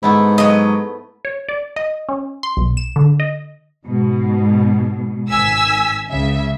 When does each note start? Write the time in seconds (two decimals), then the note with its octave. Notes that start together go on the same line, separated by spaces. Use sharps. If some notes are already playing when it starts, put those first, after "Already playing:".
0.03 G#2 A3 B3 E4
0.38 F#3 D#5
1.25 C#5
1.49 D5
1.76 D#5
2.09 C#4
2.43 C6
2.57 B1
2.77 E7
2.96 D3
3.20 D#5
3.85 G#2 B2
5.30 G#1 G#5 E6 B6
6.09 C#2 C#3 E5